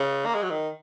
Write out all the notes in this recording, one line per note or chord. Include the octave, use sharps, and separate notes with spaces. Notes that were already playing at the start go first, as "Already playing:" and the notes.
Already playing: C#3
A#3
G#3
F#3
D#3